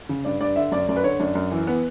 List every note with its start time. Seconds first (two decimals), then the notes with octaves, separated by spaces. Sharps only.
0.09 C#3
0.25 G2 D5
0.41 G2 D5
0.56 D3 E5
0.72 F#2 D5
0.89 F#2 D5
0.96 B4
1.04 D3 C#5
1.20 F#2 D4
1.35 F#2
1.51 E3
1.67 B3